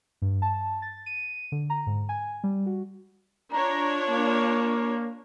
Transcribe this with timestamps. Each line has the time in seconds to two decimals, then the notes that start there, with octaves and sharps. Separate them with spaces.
0.22 G2
0.42 A5
0.82 A6
1.06 D#7
1.52 D3
1.70 A#5
1.86 G#2
2.09 G#5
2.44 G3
2.66 F#4
3.53 D4 F4 C#5 A#5
4.08 A#3